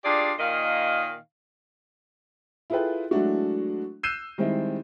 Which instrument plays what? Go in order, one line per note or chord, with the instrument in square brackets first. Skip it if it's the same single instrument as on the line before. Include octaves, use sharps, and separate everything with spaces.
[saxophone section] D4 F4 G4 G#4 D5
A#2 D#3 A#3 D#5 F5
[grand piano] E4 F4 G#4 A4 B4 G5
F#3 G#3 A3 D4 E4 F#4
E6 F#6 G6 C7 D#7 E7
D#3 G3 G#3 C4 E4